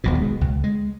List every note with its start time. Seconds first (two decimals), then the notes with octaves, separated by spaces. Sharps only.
0.04 D#1 B1 B2
0.20 B2 G#3
0.41 C#2
0.64 G#3